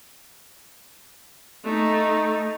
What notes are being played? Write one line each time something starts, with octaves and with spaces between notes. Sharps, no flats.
A3 D#4